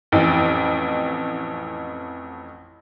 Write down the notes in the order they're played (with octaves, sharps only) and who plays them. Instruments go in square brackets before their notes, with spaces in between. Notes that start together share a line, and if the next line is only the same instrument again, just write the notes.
[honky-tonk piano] A1 F2 E3